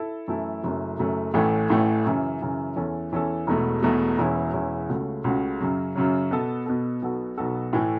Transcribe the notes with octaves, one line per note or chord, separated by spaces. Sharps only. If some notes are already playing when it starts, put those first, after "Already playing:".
Already playing: E4 A4
F#2 E3 A3 E4 A4
F#1 F#2 F#3 A3
F#1 F#2 F#3 A3
A1 A2 E3 A3
A1 A2 E3 A3
F#2 C#3 E3
F#2 C#3 E3
E2 E3 C#4 A4
E2 E3 C#4 A4
E1 E2 B2 A3
E1 E2 B2 A3
E1 E2 E3 C#4 E4
E1 E2 E3 C#4 E4
C#2 C#3 A3 F#4
C#2 C#3 A3 F#4
F#2 C#3 F#3
F#2 C#3 F#3
B2 B3 A4
B2 B3 A4
B1 B2 B3 F#4 A4
B1 B2 B3 F#4 A4
A2 E3 A3